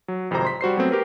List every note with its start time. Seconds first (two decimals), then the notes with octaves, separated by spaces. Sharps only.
0.08 F#3
0.30 G#1 F2 C3 C5 A#5
0.45 C6 B6
0.61 G3 F#4 C5 C7
0.77 F#3 A3 B3 C4
0.91 G4 A#4 B4